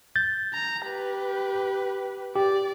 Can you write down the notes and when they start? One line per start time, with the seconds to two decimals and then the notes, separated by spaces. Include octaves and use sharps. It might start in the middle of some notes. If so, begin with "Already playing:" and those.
0.16 G6 A6
0.54 A#5
0.84 G4 B4
2.36 G4 D5